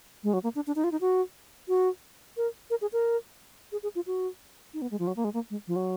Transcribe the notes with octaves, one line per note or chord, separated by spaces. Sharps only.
G#3
F#3
A#3
D4
D4
D#4
F4
D#4
F#4
F#4
A#4
A#4
G#4
A#4
G#4
G#4
F4
F#4
D#4
B3
G#3
F3
F#3
A#3
G#3
A#3
G#3
F3
F#3